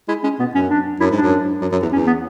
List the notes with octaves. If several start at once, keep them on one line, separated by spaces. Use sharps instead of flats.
G#3 E4
G#3 C#4
B2 B3
F#2 C#4
D4
F#2 E4
G#2 D4
F#2
F#2
F#2
E2
E2 C#4
B3